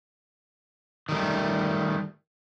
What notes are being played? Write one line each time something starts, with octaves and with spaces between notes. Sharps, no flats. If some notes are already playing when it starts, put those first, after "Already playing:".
D#3 G3 A3